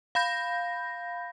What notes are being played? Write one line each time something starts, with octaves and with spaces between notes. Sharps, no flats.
F5 B5 G6 A#6